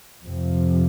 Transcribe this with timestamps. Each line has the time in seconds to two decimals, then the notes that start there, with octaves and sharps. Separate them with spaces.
0.24 F2 C3 F3